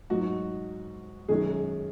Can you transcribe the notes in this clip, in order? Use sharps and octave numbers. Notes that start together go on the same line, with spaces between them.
G#2 F#3 D#4 F#4
F#2 D#3 G#3 C#4 G#4